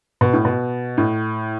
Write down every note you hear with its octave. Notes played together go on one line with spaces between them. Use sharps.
B2
A2
B2
A2